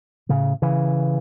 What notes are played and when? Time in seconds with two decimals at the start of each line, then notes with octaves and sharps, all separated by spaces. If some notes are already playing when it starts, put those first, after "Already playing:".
0.29 A2 C#3
0.62 C#3 E3